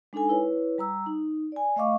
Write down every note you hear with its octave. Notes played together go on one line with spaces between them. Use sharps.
G#3 D4 D#4 A4 G#5
E4 B4 C#5
G3 A#5 E6
D#4
D5 G#5
A3 D#5 F5 C#6 D6